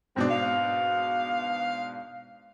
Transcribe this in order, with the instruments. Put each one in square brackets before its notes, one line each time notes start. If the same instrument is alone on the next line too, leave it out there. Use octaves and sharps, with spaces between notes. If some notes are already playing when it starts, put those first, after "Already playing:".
[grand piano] G#2 B2 D4 [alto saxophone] C4
[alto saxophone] F5